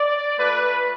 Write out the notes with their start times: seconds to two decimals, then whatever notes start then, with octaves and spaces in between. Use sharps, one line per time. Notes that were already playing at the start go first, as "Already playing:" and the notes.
Already playing: D5
0.37 A3 F4 B4